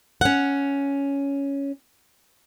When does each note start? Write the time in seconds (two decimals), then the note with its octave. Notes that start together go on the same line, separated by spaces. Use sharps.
0.21 C#4 F#5